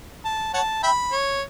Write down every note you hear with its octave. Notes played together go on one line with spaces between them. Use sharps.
A5
C#5 F#5 A5
E5 G5 B5
C#5